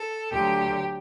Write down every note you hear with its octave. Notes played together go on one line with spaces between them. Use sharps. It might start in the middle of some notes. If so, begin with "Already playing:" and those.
Already playing: A4
D2 D3 F#3 G4